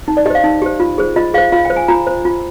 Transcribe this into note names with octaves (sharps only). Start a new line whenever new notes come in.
D#4
D5
G4 C5 D#5 F5
D#4
G4 C5
F4
G#4 C5
F4 D#5
G#4 C5 F5
F4 F5
G5
C5
G#5
F4 A#5
C5
F4